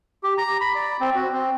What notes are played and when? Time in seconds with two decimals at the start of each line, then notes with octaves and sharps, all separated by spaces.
0.23 G4
0.38 A#5
0.61 B5
0.75 D5
1.01 C4
1.15 F#4
1.32 C4